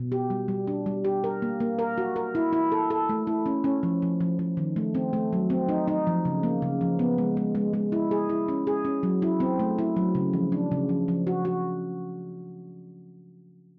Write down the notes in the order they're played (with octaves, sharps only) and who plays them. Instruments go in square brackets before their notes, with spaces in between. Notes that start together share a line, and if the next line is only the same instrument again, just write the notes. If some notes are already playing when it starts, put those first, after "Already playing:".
Already playing: [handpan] B2
G4
G3
G3
D4
G3
G4
A#4
A#3
A#3
A#4
F#4
A#4
E4
E4
A4
A4
A3
E4
C#4
C#4
F3
F3
F3
F3
D#3
A3
C4
A3
F#3
C4
D#4
D#4
F3
C#3
A#3
C#3
F3
B3
G#3
G#3
G#3
G#3
E4
G#4
E4
C#4
G#4
C#4
F#3
E4
C4
A3
E4
F#3
C#3
F3
D4
C#3
F3
F3
F#4
F#4